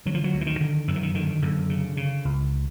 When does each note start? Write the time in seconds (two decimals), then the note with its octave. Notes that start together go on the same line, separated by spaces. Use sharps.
0.06 D3 F#3
0.14 F3
0.24 F#3
0.34 D2
0.41 E3
0.47 D#3
0.61 D3
0.88 F#2 D#3
0.96 E3
1.03 D#3
1.15 D3 D#3
1.42 F#2 D3
1.70 C#3
1.97 C#3
2.25 C#2